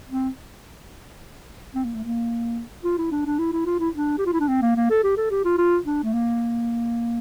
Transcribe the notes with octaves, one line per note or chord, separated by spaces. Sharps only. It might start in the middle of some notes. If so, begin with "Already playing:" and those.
C4
C4
A#3
A3
A#3
F4
E4
D4
D4
E4
E4
F4
E4
D4
G4
F4
E4
D4
C4
A#3
A#3
A4
G4
A4
G4
F4
F4
D4
A3
A#3